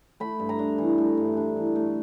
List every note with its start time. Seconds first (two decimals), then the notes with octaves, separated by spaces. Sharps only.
0.20 A3 B5
0.39 G2
0.49 A#5
0.59 D4
0.78 E3
0.98 A3
1.17 G2
1.37 D4
1.56 E3
1.76 A3